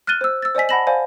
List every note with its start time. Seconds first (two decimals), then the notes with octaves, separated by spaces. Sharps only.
0.07 F6 F#6 A6 D#7 G7
0.21 C5 E6
0.42 E6 A6
0.55 C5 D5 D#5 G#5 B6
0.69 F#5 A5 B5 A#6 E7 F#7
0.87 C5 D5 F5 G#5